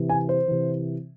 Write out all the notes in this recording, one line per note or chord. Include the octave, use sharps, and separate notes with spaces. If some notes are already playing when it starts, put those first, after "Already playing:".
Already playing: C3 E3
G#5
C5
C3 E3